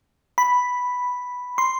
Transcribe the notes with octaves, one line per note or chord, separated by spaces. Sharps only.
B5
C6